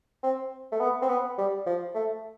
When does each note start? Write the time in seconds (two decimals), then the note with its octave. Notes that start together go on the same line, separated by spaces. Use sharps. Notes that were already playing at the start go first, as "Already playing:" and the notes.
0.23 C4
0.72 A3
0.80 B3
1.02 C4
1.09 B3
1.38 G3
1.66 F3
1.95 A3